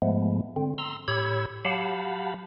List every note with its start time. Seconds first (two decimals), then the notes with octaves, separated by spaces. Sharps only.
0.02 G#2 F3 G#3 A3 B3
0.56 D3 C4
0.78 A#5 C6 E6
1.08 A2 G4 C#5 B5 E6 G#6
1.65 F#3 G4 F5 F#5 A5 B5